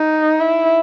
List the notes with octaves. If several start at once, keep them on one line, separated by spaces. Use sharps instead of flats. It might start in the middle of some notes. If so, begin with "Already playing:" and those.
Already playing: D#4
E4